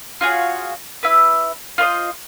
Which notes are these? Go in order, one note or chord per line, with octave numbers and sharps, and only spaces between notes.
F4 F#4 G#4 C#5
E4 B4
F4 C5 C#5 D#5